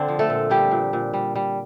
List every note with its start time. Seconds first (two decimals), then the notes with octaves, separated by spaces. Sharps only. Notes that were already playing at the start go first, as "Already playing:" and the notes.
Already playing: D3 C4 D4
0.08 F3
0.19 A3 A4
0.30 A#2
0.50 F3 G3 G4
0.71 A#2
0.93 A#2
1.14 G3
1.35 G3